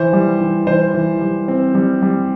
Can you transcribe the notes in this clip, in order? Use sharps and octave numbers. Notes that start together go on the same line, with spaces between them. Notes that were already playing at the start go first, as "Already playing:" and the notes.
Already playing: E3 C5
G3
E3
E3 C5
E3
G3
C4
G3
G3